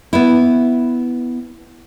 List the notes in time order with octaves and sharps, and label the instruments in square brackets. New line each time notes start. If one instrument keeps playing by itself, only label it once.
[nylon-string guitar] B3 E4